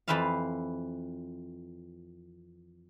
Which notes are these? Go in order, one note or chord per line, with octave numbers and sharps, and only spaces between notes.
F2 E3 B4 C5 E5 F5